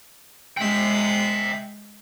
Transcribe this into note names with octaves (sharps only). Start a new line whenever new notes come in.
G#3 E5 G5 F#6 G6